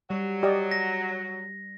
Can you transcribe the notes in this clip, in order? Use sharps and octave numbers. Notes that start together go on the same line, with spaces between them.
F#3 G3
G4 D5 D#5
A#6